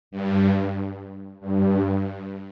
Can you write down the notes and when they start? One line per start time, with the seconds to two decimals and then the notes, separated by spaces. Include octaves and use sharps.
0.11 G2
1.41 G2